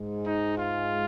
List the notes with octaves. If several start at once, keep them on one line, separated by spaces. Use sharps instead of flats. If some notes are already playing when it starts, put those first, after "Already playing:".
Already playing: G#2 G#3
D#4
F4